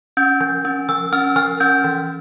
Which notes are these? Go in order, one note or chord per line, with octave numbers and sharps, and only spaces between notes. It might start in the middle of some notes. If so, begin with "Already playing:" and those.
C#4 G6
F3 G6
C#4
F3 E6
C#4 F6
F3 F6
C#4 G6
E3